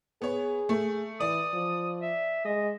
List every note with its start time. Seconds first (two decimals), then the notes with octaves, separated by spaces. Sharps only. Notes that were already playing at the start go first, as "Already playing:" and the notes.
0.22 B3 G#4 C#5
0.69 A3
1.21 E3 D5 D#6
1.53 F3
2.01 E5
2.45 G#3 D#5